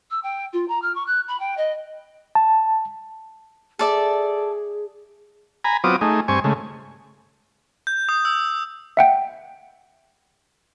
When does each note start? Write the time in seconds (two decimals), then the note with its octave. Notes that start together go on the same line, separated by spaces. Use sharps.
0.10 E6
0.23 G5
0.53 F4
0.68 A#5
0.82 F6
0.95 C#6
1.06 F#6
1.28 B5
1.40 G5
1.57 D#5
2.35 A5
3.79 G#4 A4 D5 E5
5.65 G#5 A#5 B5
5.84 F#3 B3 C4 F4 D6 D#6
6.01 A3 D#4 G#4
6.28 G2 C4 G#5 C#6
6.44 C#3 G#3 A3
7.87 G6
8.09 D#6
8.25 E6
8.97 E5 F#5 G5